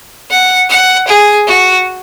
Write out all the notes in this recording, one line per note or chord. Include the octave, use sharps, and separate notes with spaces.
F#5
F#5
G#4
F#4